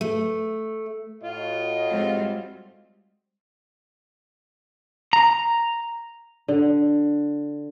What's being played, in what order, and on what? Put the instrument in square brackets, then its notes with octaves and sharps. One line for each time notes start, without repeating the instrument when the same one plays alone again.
[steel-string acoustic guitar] A3
[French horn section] A2 F#4 D#5 [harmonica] F4
[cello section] G3 G#3 C4
[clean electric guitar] A#5
[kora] D3